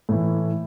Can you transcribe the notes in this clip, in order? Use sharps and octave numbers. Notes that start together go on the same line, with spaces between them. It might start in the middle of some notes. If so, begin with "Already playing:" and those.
A2 E3